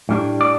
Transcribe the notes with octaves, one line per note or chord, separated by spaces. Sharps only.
A2 G3 D4
D5